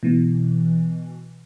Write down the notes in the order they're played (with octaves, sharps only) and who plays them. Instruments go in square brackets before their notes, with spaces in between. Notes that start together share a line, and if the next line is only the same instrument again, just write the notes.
[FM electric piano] B2 E3